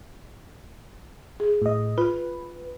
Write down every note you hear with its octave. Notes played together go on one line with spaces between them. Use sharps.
G#4
A2 D#5
F4 B4